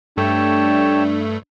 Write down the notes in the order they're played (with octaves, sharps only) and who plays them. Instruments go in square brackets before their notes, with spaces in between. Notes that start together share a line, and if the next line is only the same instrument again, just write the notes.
[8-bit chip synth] G2 A3 [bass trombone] D4 [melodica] G4 C#5 A5